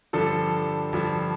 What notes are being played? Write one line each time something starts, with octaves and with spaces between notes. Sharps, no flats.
G2 D3 F3 A4
G2 D3 F3